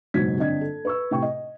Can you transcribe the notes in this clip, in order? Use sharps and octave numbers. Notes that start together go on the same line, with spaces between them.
F#1 G#2 B2 F#3 G#6 B6
G1 C4 D4 D#5 G#6
A4
B4 C#6 E6
A2 C3 G5 C#6
D#5